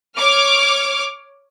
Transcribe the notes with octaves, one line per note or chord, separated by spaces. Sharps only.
C#5 D6 F6